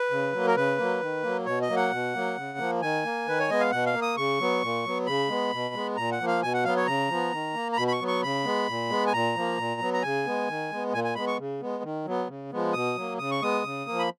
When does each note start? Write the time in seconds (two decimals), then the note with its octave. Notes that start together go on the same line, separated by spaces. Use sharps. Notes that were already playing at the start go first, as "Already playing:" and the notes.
Already playing: B4
0.10 C#3
0.33 F#3 A#3
0.47 A#4
0.56 C#3 B4
0.78 F#3 A#3
1.01 D#3
1.23 F#3 A#3
1.45 B2 C#5
1.62 D#5
1.69 F#3 A#3
1.76 F#5
1.91 B2
2.14 F#3 A#3
2.37 C#3
2.58 F3 A#3
2.82 D#3 G#5
3.05 A#3
3.27 D#3 B4
3.40 C#5
3.48 G#3 B3 D#5
3.60 F5
3.71 B2 F#5
3.86 F5
3.94 A#3
4.02 D#6
4.16 C#3 C#6
4.40 F#3 B3
4.62 A#2
4.85 F#3 B3
5.06 C#3 B5
5.29 G#3 B3
5.52 B2
5.74 G#3 B3
5.96 A#2 A#5
6.12 F#5
6.20 F3 A#3
6.27 F5
6.43 B2 G#5
6.54 F#5
6.64 F#3 B3 F5
6.77 C#5
6.87 C#3 A#5
7.09 F3 B3
7.32 D#3
7.54 A#3
7.73 A#5
7.77 B2 B5
7.88 B5
7.92 C#6
8.01 F#3 B3
8.08 C#6
8.23 C#3 B5
8.45 G#3 B3
8.68 A#2
8.90 G#3 B3
9.07 G#5
9.13 A#2 A#5
9.36 F3 A#3
9.58 A#2
9.81 F#3 B3
9.94 A#5
10.02 C#3 G#5
10.26 G#3 B3
10.48 D#3
10.71 G#3 B3
10.93 A#2 G#5
11.04 G#5
11.15 G#3 B3 B5
11.27 C#6
11.38 C#3
11.61 G#3 B3
11.84 D#3
12.05 F#3 B3
12.28 C#3
12.51 F3 G#3 B3
12.73 B2 D#6
12.96 F#3 A#3
13.18 C#3 D#6
13.31 C#6
13.42 G#3 B3 D#6
13.64 C#3
13.86 F3 A#3
13.99 B5